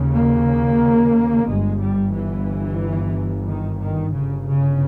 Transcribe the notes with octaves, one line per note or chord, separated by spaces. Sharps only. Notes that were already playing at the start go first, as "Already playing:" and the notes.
Already playing: D#2 C#3
A#3
G1 G2 G#3
G3
E3
D#3
D#3
G1 G2 C#3
C#3